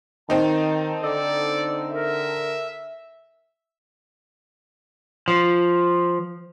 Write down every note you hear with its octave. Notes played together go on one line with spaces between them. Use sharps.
D#3 C4 D#4 A5
D3 A4 D5
A#4 E5
F3